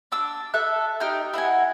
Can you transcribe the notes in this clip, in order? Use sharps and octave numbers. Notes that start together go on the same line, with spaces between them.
D4 D6 E6
A4 E5 F#6
D#4 G4 G5 F6
E4 D#5 F#5 G#5